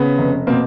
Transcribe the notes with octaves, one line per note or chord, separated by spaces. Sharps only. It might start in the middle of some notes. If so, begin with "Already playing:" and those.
Already playing: C#3 B3
F1
B2 A#3 C4